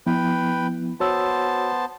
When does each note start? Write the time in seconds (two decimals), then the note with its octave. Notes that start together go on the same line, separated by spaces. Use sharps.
0.07 F3 B3 E4 B4 G5
1.00 B3 F#4 C5 C#5 A5 E6